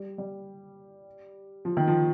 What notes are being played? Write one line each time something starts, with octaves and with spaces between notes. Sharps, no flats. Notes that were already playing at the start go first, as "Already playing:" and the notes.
Already playing: G3
G3
F3
D#3
F3